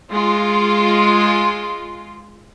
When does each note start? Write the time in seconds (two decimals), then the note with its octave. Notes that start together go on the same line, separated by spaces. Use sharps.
0.10 G#3 F4